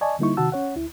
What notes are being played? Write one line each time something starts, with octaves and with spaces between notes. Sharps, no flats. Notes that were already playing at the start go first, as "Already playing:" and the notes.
D5 D#5 G#5 A5 C#6
D3 G3 A#3 D#4 E4 C#6
C3 D#3 F#4 F#5 A5 E6
C#4 C#5 F#5
D2 E4